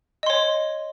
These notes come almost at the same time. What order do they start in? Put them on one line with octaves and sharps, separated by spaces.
D#5 C6 C#5